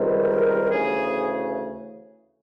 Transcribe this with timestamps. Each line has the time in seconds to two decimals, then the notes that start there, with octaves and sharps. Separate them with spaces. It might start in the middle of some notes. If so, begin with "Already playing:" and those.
Already playing: C#2 C3 D#3 G3
0.20 A#4
0.72 D2 C#3 E3 A3 G#4